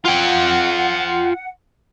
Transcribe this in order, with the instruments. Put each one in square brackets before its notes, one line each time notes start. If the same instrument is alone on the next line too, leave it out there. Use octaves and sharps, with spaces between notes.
[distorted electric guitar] F4 G5 [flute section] F#5